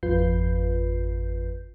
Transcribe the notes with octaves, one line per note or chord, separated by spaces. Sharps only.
G#1 F2 F4 B4 G6 C7